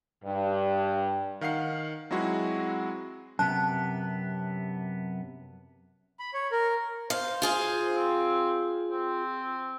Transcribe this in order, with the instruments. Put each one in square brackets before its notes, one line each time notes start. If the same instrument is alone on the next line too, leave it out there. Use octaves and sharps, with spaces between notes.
[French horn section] G2
[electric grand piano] D#3 F5 F#5 C7
F#3 G#3 C4 E4 F#4
[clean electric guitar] F#2 C3 B3 [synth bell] A5 F#6
[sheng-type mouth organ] B5
C#5
A#4
[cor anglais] C5 [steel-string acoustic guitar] F5
[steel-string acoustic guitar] F4 G#4 F5
[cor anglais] C4
C4